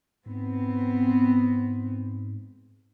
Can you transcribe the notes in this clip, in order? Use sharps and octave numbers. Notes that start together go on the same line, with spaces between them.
G#2 B3 C4